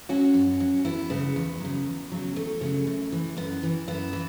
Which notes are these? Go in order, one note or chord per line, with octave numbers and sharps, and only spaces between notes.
F#3 C#4 F#4
F#2
F#3
E2 B3 E4
C#3 F#3 B3
E2
C#3 F#3
E2
C#3 F#3
E2 A3
C#3 F#3
F#2
E3
F#2 B3
E3
F#2 B3 E4
E3